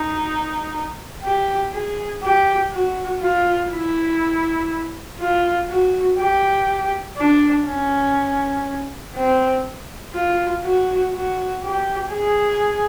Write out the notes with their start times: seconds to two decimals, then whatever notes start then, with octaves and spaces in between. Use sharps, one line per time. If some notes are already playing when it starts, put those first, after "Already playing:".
Already playing: D#4
1.23 G4
1.73 G#4
2.23 G4
2.72 F#4
3.21 F4
3.71 E4
5.20 F4
5.68 F#4
6.18 G4
7.17 D4
7.66 C#4
9.15 C4
10.14 F4
10.64 F#4
11.14 F#4
11.63 G4
12.12 G#4